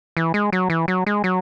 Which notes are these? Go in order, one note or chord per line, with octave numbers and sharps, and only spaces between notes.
E3
G#3
F#3
E3
F#3
G#3
F#3